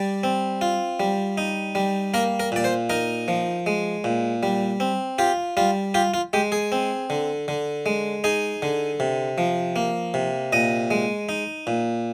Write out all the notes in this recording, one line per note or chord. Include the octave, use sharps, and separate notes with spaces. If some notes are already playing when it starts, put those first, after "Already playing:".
Already playing: G3 D5
C4
F4
G3
D#4
G3
A#3 A#4
A#4
A#2 D5
C5
D#4 A#4
F3
G#3
A#2
G3
C4
F4 G4
G3 F4
F4 G4
F4
G#3 G4
G#4
C4
D3
D3
G#3
D#4 G#4
D3
C3
F3
A#3
C3
A#2 D#5
G#3
D#4
A#2